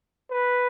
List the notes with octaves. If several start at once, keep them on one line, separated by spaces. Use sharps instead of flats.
B4